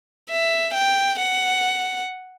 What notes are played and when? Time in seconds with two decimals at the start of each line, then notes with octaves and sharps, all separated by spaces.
0.29 E5
0.74 G5
1.19 F#5